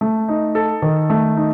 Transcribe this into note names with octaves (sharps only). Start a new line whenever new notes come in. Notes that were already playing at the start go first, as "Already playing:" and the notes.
A3
D#4
A4
D#3
A3
D#4